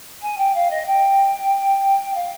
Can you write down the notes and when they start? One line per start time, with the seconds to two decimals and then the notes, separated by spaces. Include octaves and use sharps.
0.22 G#5
0.37 G5
0.54 F5
0.70 D#5
0.86 G5
2.14 F5